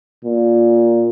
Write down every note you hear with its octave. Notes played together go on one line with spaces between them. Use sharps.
A#2